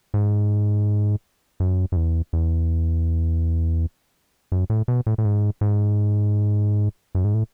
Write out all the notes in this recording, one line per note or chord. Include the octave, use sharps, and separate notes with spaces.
G#2
F#2
F#2
E2
E2
F#2
A2
B2
A2
A2
G#2
G#2
F#2
G#2
A2